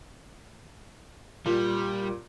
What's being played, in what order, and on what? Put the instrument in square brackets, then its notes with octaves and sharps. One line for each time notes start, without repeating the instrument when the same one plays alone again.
[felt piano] A#2 [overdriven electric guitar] G3